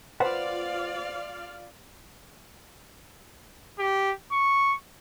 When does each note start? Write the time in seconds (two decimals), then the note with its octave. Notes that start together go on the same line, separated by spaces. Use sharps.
0.20 F4 B4 C5 D5 F5 F#5
3.79 G4
4.32 C#6